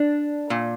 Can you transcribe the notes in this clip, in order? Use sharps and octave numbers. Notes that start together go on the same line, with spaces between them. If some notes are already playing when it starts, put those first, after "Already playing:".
Already playing: D4
A#2